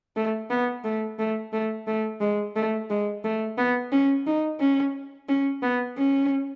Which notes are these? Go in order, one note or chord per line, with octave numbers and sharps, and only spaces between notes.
A3
B3
A3
A3
A3
A3
G#3
A3
G#3
A3
B3
C#4
D#4
C#4
C#4
B3
C#4